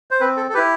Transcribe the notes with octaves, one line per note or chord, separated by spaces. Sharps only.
C5
C4 B4
A4
A4
E4 G4 B4